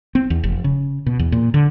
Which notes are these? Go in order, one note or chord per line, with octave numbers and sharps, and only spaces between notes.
C4
E2
F1
C#3
B2
E2
A#2
D3